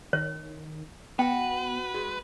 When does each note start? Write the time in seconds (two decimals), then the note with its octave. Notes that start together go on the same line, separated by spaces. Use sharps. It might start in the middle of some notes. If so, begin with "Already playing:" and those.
0.13 D#3 C#5
1.19 B3 F#4 B4 F#5 G5
1.94 G#3 F#4